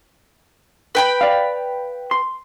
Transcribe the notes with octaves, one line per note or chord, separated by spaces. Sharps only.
B4 G5 B5
D5 F5
C6